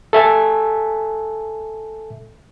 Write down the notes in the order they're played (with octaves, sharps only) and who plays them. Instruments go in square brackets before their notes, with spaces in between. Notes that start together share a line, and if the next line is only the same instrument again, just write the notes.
[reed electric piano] A4 E5 G#5 A5